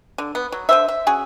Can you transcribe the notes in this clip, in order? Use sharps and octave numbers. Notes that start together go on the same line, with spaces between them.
D3
B3
F#3
D3 C5 E5
E5
C#4 F#4 G#4